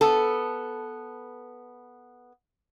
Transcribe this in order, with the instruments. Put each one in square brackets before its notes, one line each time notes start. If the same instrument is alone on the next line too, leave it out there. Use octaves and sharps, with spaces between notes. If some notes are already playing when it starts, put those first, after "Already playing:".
[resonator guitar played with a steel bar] B3 A4